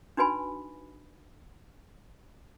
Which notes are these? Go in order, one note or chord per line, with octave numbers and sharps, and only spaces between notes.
D4 D#4 F#4 B4 G#5 B5